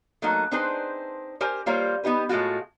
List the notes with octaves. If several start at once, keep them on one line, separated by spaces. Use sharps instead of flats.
F#3 A3 A#3 D#4 A#4
C4 D4 D#4 G#4 B4 C5
G4 A#4 C5 G#5
G3 A#3 F4 C5 C#5
B3 D#4 G4 B4
A2 G#3 A3 F4 F#4